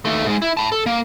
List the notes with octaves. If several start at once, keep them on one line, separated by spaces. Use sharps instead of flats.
D#2 A3
G#2 G#3
E4
A5 B5
A4
A#3